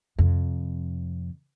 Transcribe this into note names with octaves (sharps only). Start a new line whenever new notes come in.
F2 C3